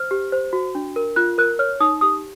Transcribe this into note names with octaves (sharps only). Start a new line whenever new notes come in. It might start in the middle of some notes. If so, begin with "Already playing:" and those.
Already playing: C5 F6
G4
C5
F#4
D4
A#4
F4 F#6
A#4 F#6
C#5 F6
D#4 D#6
G4 D#6